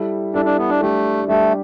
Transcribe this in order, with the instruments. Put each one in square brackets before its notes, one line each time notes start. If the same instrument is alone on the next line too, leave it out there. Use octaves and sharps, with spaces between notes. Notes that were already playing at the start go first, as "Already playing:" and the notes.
Already playing: [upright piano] G3 E4 A4
[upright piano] G3 E4 A4 [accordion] D4
[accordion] D4
B3
D4
[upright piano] G3 D4 G4 [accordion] A3
[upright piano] G3 D4 G4 [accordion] A3